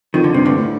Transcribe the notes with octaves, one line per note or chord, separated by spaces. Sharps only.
F2 D#3
D3
G2 C3
D2 D3
A2